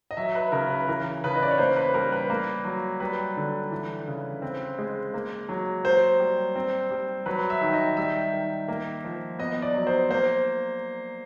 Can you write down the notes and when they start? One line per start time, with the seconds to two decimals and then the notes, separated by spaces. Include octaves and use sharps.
0.11 D#5
0.17 F#3 E5
0.35 B4
0.52 C#3 A#4
0.70 B4
0.88 E3 A#4
1.24 C#3 B4
1.35 D#5
1.43 D5
1.51 C#5
1.58 A#3 C5
1.76 B4
1.94 G3 A#4
2.12 B4
2.30 A#3
2.65 F#3
3.00 G3 B4
3.37 D3
3.71 E3
4.08 C#3
4.42 C4
4.78 G#3
5.14 A#3
5.49 F#3
5.85 A#3 C5
6.20 G3
6.56 C4
6.91 G3
7.26 F#3 B4
7.50 E5
7.61 D#3
7.73 D#5
7.97 G3 E5
8.33 D#3
8.68 A#3
9.04 F3
9.39 B3 D#5
9.62 D5
9.74 F#3
9.87 C5
10.10 A#3 C5